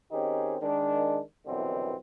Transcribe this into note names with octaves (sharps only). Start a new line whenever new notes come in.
D#3 C4 C#4 D#4 G4 G#4
D#3 G#3 D4
C2 F#2 B2 D3 E3 C4